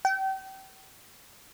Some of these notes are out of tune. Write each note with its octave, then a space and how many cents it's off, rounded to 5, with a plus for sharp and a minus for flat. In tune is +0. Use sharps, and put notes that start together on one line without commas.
G5 -35